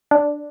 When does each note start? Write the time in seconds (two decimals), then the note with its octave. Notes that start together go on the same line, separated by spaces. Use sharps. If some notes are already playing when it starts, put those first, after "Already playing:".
0.11 D4